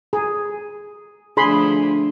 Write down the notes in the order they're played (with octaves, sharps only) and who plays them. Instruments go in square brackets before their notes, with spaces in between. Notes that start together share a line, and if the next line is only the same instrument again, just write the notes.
[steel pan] G#4
[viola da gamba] D3 F3 A3 [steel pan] G#4 B5 C6